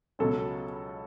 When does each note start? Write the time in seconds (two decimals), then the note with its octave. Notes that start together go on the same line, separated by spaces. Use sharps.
0.19 C#2 B2 F#3 C#4 A4